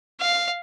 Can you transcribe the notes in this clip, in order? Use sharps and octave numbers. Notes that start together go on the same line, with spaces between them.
F5